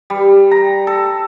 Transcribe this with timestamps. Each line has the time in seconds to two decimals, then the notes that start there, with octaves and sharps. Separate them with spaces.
0.10 G3
0.51 A#5
0.87 A4